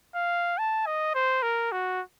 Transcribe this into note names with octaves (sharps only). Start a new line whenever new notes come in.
F5
A5
D#5
C5
A#4
F#4